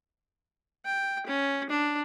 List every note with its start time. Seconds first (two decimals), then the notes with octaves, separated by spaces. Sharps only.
0.85 G5
1.26 C#4
1.70 D4